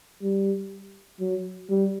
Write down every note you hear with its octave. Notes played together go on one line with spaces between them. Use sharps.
G3
F#3
G3